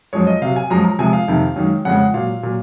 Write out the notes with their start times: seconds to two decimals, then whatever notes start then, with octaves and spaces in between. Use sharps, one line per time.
0.13 F#2 F3 G#3 C#5
0.27 D#5
0.42 C3 F#3 F5
0.56 G#5
0.70 F#2 F3 G#3 A#5
0.85 A#5
0.99 C3 F3 G#3 G#5
1.13 F5
1.28 F2 C3 D#3
1.56 F#2 D#3 G#3
1.85 F2 C#3 F3 G#3 F#5
2.14 A#2 F#3 F5
2.43 A#2 F#3